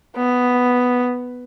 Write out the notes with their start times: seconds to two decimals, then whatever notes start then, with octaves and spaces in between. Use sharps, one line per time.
0.16 B3